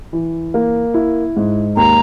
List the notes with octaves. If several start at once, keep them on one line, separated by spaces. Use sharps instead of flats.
E3
A#3
E4
G#2
D#2 A#5